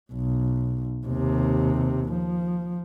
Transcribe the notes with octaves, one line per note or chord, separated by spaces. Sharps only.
B1
D#2 C3
F3